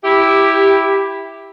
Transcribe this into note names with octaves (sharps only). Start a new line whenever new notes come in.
E4 G4